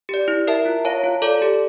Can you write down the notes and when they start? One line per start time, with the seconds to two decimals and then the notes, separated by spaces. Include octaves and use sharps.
0.09 G4 D5
0.28 E4
0.47 A#4 E5 A5
0.66 F4
0.85 C#5 F5 A5
1.03 F4
1.22 A4 D5 A5
1.42 G4